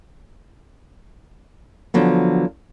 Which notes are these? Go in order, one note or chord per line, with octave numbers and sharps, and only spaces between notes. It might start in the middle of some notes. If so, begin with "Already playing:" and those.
D3 F3 F#3 B3